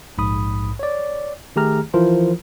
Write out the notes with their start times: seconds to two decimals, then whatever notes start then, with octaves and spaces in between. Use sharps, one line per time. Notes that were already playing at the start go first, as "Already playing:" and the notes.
0.18 A#1 G#2 B5 D#6
0.79 C#5 D5
1.56 D#3 A3 G4 G#4 A#5 F6
1.94 E3 F3 E4 F4 A#4 C5